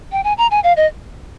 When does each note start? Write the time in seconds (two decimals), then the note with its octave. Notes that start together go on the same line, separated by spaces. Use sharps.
0.12 G5
0.24 G#5
0.38 A#5
0.51 G#5
0.64 F5
0.77 D#5